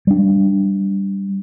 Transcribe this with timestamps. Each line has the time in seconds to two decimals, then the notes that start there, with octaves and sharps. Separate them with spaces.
0.07 G3 D4